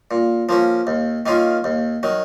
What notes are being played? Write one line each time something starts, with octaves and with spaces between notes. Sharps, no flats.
A#2
F3 A#3 C#4
D#2
D#3 A#3 C#4 F4
D#2
D#3 F#3